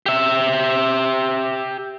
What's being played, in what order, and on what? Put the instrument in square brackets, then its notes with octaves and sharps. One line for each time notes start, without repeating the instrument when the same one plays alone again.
[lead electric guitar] G4 E5